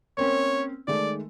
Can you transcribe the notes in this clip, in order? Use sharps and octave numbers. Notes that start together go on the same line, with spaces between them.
A#3 C4 C#4 C#5
D#3 G#3 A3 D5